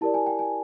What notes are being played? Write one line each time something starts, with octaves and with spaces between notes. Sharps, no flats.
E4 G4 A#4 D5 A5
G#5
G5
G#5